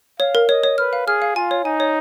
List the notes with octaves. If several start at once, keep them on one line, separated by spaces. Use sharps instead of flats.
C#5 F5
A#4
C#5 D#5
C#5
B4 F6
F5
G#4 F6
F5
F4 G#5
C#5
D#4 G#5
C#5